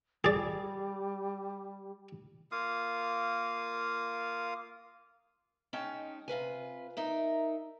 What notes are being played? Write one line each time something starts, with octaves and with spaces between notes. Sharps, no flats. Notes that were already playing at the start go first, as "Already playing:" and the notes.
G3 G#4 D5
A#3 F4 F5 D#6
G#3 C#4 D#4 G5 A5
C3 F4 B4 G#5
D#4 A#4 E5